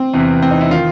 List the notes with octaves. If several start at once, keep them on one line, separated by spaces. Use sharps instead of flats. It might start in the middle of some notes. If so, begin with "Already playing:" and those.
Already playing: C4
E2 C3 E3
C4
D#4
E4
D#3 F4